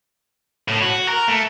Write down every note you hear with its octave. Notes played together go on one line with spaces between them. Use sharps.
A2
F#4
A#4
A3